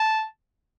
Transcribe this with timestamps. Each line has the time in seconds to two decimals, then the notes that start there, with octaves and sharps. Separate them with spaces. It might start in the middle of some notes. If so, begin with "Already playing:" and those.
Already playing: A5